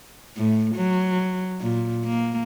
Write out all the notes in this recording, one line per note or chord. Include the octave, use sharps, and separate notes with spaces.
A2
F#3
A#2
A#3